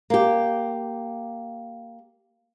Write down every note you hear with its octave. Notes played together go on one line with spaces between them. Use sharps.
A#3 G4